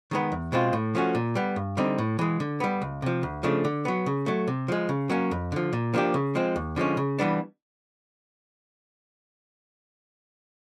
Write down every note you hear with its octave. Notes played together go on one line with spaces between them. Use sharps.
D#3 G#3 B3
E2
B2 G#3 C4 F4
A2
F3 A3 C#4 F#4
A#2
G3 B3
G2
D3 G3 C4 D#4
A2
E3 G#3
D3
G3 B3
C#2
C3 F3
D2
C#3 F3 A3 D4
D3
F#3 B3
C#3
F#3 A3
C3
F3 G#3
C#3
F#3 A#3 C#4
F2
D3 F3
A#2
F3 A#3 D4 G4
C#3
F3 G#3 C4
D#2
D3 F3 G#3 C#4
C#3
E3 G3 B3 D4